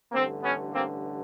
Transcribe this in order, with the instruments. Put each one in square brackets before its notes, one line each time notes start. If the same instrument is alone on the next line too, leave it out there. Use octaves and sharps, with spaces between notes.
[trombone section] A1 G2 D3 A#3 C4
B3 C#4
A#3 C4